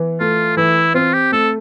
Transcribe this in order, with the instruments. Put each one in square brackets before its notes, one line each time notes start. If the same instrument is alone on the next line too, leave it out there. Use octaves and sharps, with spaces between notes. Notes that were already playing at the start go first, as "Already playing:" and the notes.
Already playing: [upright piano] E3 B3
[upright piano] A3 [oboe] F4
[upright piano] E3 [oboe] E4
[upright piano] C4 [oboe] F4
[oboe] G4
[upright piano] A3 [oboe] A4